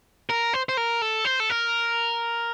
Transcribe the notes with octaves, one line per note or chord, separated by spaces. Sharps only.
A#4
C5
C5
A#4
A4
C5
A4
A#4